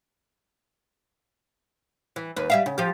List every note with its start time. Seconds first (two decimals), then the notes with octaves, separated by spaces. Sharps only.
2.16 E3
2.36 D#2 B4
2.50 G3 E5 F5
2.66 C#3
2.78 F3 G4